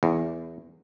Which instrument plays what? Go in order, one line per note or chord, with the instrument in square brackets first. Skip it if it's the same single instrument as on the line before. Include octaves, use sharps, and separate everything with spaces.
[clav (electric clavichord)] E2